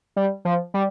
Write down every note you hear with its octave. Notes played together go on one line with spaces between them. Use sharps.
G3
F3
G3